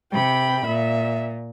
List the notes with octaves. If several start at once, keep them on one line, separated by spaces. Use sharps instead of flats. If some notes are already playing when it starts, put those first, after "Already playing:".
C3 G5 B5
A#2 E5